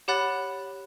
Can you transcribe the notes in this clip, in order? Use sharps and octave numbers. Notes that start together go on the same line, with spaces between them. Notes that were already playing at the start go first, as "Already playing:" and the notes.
G4 C#5 F#5 B5 F#6 A6